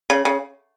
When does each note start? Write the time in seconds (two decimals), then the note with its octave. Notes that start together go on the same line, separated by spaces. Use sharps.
0.10 C#3
0.25 C#3